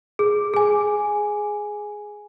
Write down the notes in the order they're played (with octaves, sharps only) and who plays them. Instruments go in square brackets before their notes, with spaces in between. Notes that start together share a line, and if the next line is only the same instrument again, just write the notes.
[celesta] G#4
G#4 G#5